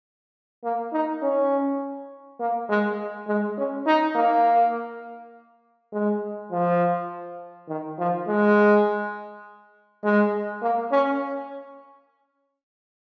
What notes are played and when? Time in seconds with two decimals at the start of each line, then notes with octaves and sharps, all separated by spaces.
0.64 A#3
0.93 D#4
1.23 C#4
2.40 A#3
2.69 G#3
3.28 G#3
3.58 C#4
3.87 D#4
4.16 A#3
5.93 G#3
6.52 F3
7.69 D#3
7.99 F3
8.28 G#3
10.04 G#3
10.62 A#3
10.92 C#4